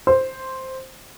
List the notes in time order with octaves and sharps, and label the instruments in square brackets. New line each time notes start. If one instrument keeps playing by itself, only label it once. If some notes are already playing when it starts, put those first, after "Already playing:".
[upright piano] C5